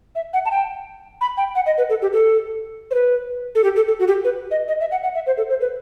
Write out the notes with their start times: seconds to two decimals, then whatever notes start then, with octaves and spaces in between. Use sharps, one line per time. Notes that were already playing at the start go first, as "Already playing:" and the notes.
0.15 E5
0.33 F#5
0.45 A5
0.51 G5
1.21 B5
1.37 G5
1.55 F#5
1.66 D#5
1.78 B4
1.90 A4
2.02 G4
2.13 A4
2.91 C5
2.94 B4
3.55 A4
3.64 G4
3.76 A4
3.88 A4
3.99 F#4
4.08 G4
4.24 B4
4.51 D#5
4.68 D#5
4.80 E5
4.91 F#5
5.03 F#5
5.15 E5
5.27 C5
5.37 A4
5.49 C5
5.61 B4